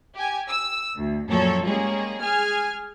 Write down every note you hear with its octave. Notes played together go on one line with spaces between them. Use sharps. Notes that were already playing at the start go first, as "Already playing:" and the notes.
G4 G#5
E6
D2
F#2 A#2 F3 A4 C#5
G3 G#3 A#3 C#4 G#4
G#4 G#5 F6